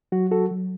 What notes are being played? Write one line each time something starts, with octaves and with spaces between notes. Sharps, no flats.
F#3 F#4
F#4 A4
F#3